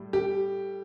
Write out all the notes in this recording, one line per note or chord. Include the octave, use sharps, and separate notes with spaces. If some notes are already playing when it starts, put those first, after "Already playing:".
Already playing: A2 G3
G4